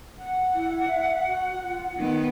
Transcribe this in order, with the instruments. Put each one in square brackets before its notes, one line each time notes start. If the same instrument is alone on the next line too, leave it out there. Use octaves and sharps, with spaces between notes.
[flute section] F#5
[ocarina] E4
E5
F#4
F4
[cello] D#3 B3 [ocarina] D#4